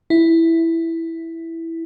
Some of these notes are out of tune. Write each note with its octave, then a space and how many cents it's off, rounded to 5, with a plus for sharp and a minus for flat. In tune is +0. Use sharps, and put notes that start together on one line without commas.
E4 +0